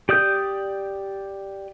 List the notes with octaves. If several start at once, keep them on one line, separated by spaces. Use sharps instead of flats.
G4 D5 D#6 G6